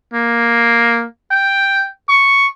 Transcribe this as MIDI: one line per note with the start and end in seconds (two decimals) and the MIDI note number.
0.14 1.05 58
1.31 1.87 79
2.09 2.48 85